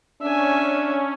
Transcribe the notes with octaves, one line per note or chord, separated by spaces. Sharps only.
C#4 D4 E5 G#5